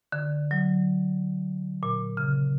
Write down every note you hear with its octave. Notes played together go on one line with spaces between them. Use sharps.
D3
F#3
A#2
C#3